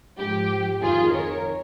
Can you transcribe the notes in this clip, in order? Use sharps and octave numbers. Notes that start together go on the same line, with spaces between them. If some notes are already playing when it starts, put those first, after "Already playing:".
G#2 F3 G4
F2 D#3 F4 G#4
A#4 C#5